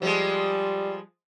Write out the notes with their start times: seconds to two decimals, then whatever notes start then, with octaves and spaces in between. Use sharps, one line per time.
0.02 F3 G3 G#3